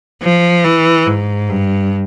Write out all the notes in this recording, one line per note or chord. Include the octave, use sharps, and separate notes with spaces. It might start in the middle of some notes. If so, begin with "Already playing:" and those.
F3
E3
G#2
G2